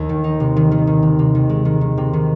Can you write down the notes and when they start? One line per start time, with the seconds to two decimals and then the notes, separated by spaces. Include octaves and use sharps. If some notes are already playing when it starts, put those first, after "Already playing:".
Already playing: D#2
0.09 D#3
0.24 D#4
0.40 C3
0.56 D#3
0.72 D#3
0.87 D#3
1.03 C3
1.19 C3
1.35 D#3
1.49 G#3
1.65 D#3
1.81 D#3
1.98 C3
2.13 D#3